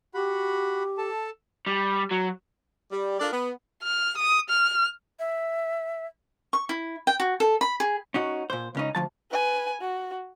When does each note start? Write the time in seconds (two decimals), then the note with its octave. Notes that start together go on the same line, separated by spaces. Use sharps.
0.14 F#4 G4 F#5 B5
0.98 A4 A5
1.67 G3
2.11 F#3
2.92 G3
3.20 D4 F4 A4 A#4 D5
3.32 B3
3.83 F6
4.18 D#6
4.49 F6
5.19 E5
6.53 C#6
6.69 E4
7.07 G5
7.20 F#4
7.40 A4
7.61 B5
7.80 G#4
8.14 C#4 D#4 F#4
8.50 A#2 C5
8.75 C#2 C#4 D#4
8.95 D2 F3 A5
9.31 B4 G#5
9.81 F#4